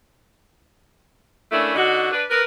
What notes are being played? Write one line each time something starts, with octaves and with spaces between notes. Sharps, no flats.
A3 A#3 C#4 D4 E4
D3 D#4 F#4
D4 B4
A#4 B4